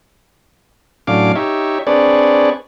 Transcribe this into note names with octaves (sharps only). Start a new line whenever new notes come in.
A2 F#3 C#4 D4 F5 D6
D#4 G4 C#5 E5
C4 D4 G#4 B4 C#5 D5